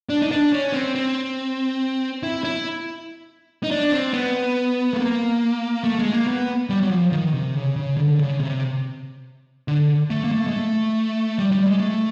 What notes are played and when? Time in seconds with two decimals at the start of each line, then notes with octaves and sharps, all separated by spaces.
0.09 D4
0.22 D#4
0.31 D4
0.53 C#4
0.73 C4
0.95 C4
2.23 E4
2.44 E4
3.63 D#4
3.71 D4
3.92 C4
4.13 B3
4.93 A3
5.00 A#3
5.84 A3
5.99 G#3
6.13 A#3
6.27 B3
6.70 G3
6.80 F#3
6.90 F3
7.12 D#3
7.33 C3
7.55 C#3
7.76 C#3
7.97 D3
8.19 C#3
8.40 C3
9.68 D3
10.10 A3
10.24 A#3
10.32 A3
10.47 G#3
10.53 A3
11.39 G3
11.52 G3
11.67 G#3
11.80 A3